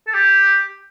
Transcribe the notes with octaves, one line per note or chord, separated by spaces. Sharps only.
A4
G4